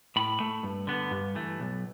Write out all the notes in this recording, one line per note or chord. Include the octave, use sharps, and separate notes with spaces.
A2 B5
A3
G2
D3 B3
G2
E3 A3
B1